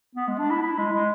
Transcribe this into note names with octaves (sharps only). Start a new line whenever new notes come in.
B3
G#3
D4
E4
E4
G#3
G#3